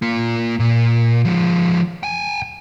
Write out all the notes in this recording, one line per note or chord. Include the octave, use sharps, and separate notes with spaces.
A#3 F4
A#2
F3 G#3
G5 G#5